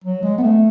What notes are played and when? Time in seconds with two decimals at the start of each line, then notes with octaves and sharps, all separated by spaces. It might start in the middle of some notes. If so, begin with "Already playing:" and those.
0.04 F#3
0.23 G#3
0.38 B3
0.42 A3